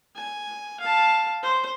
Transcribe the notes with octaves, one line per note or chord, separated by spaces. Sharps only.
G#5
F5 A5
C5